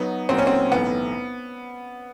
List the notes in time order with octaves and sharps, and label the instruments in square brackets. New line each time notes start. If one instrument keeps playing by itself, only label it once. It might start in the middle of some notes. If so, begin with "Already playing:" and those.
Already playing: [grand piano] F#3 D#4 F#4 [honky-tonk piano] B3
[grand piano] A#2 F#3 A#3 D#4 F#4 [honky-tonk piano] C4
[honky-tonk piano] C#4
C4
[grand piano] B1 A2 E3 [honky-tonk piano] B3